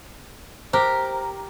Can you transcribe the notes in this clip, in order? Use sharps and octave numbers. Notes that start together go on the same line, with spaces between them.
G4 A#4 C5